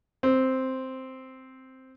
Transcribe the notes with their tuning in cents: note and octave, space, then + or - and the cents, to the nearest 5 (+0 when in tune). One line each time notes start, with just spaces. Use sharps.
C4 +0